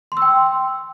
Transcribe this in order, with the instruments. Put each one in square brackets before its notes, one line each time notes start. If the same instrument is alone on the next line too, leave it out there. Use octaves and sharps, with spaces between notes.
[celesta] C6
E6
G5